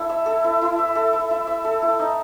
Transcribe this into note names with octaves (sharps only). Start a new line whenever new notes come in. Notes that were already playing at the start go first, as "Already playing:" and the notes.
Already playing: E4 A4
E5
A4
E4
E4
E5
A4
E4
E4
E5
A4
E4
D#4